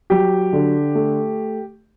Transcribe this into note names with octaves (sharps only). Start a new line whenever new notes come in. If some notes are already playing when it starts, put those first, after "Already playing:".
F#3 G4
D3
A3